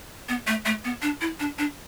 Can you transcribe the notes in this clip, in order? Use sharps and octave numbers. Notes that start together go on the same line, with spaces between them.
B3
A3
A3
B3
D4
E4
D4
D4